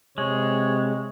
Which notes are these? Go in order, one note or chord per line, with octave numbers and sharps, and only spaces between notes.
C3 G#3 C#5